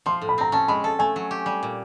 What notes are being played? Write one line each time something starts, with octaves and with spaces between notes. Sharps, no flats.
F3 C6
A2
B5
C4 A#5
C#4 A5
G#3 B5
A4 A5
A3 G#5
F#3
G4
G3
A#2